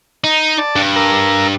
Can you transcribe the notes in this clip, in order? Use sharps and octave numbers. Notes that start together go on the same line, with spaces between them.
D#4
D5 A5
G2
A#4 A#5 E6